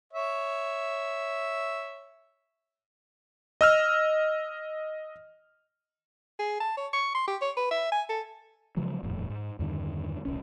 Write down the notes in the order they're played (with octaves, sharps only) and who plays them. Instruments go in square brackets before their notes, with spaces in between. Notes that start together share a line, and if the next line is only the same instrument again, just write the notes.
[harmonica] C#5 E5
[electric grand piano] D#5 E6 F6
[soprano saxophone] G#4
A5
C#5
C#6
C6
G4
C#5
B4
E5
G#5
A4
[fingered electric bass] C#3 F3 F#3 G#3
D#1 F2 A2
G#2
E2 G2 D3 D#3
D#1 C2 C#4